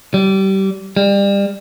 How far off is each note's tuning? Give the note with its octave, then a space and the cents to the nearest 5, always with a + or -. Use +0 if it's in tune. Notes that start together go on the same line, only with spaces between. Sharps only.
G3 -25
G3 +30